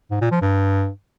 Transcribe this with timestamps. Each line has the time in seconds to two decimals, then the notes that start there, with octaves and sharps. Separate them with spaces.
0.11 G#2
0.21 A#2
0.31 F3
0.42 G2